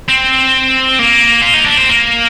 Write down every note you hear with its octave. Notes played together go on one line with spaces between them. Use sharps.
C4
A#3
F4
D#4
D4
C4
A#3